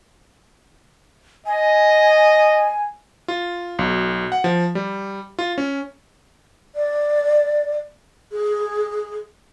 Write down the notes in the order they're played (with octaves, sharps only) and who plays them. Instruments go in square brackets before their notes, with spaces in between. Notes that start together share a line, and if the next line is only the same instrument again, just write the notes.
[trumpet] D#5 [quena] G#5
[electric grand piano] F4
B1
F#5
F3
G3
F4
C#4
[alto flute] D5
G#4